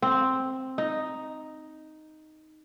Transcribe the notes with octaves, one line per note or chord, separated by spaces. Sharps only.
C4
D#4